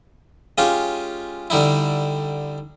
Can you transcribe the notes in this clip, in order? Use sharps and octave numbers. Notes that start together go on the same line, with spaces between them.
G#3 C#4 F4 G4
D3 G3 D#4 E4